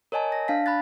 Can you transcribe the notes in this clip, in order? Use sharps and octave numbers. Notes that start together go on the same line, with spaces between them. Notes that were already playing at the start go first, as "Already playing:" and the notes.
A#4 C#5 D#5 G#5 A5
A#6
D4 F5 A5 B6
B5 F#6 A6